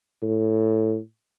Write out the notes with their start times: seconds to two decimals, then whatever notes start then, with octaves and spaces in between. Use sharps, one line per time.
0.23 A2